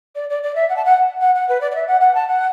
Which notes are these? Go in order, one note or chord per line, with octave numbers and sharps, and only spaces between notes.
D5
D5
D5
E5
F#5
A5
F#5
F#5
F#5
B4
D5
D5
E5
F#5
F#5
A5
F#5